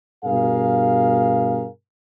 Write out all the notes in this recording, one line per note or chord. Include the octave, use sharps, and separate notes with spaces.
G2 B2 G#4 A#4 F5